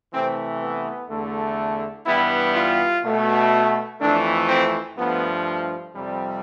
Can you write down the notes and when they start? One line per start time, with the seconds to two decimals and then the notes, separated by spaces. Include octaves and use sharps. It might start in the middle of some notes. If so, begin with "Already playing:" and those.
0.13 C3 E3 A3 C4
0.61 B3
1.09 E2 D3 A3
2.06 G2 E3 G3 B3 E4
2.55 F4
3.03 B2 A3
4.00 F2 E3 A3 D4
4.49 C4
4.98 G2 F3 A3 B3
5.95 F2 C3 G3